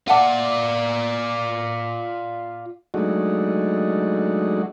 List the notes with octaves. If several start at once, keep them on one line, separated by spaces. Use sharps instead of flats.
F4 D5 E5 F#5 A5
F#3 G#3 A3 D4 D#4 F#4